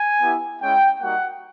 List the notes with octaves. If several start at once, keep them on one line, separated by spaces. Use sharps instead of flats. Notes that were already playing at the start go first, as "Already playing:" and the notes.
Already playing: G#5
B3 E4 G4
G#3 C#4 E4 G5
G3 A#3 D#4 F#4 F#5